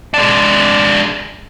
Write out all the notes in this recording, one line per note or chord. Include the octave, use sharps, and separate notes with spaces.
G#3 D4